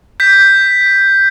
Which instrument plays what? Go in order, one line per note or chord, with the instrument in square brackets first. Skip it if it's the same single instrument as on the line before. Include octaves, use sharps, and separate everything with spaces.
[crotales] G6 B6